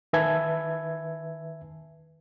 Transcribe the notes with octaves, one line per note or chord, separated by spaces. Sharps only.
D#3 B4 E5 G#5 A5 G#6